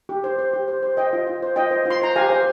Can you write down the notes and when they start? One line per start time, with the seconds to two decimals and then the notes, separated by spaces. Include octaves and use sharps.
0.09 G4
0.24 C5
0.39 C5
0.54 G4
0.68 C5
0.83 C5
0.97 C5 D#5 G5
1.13 F4
1.27 F4
1.42 C5
1.56 F4 D#5 G5
1.71 C5
1.86 F4 C6
2.01 C5 A#5
2.16 G4 F5 G#5
2.30 C5